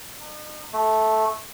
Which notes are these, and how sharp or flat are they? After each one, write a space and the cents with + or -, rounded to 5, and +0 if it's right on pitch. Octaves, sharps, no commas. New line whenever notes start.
D#4 -45
A3 -10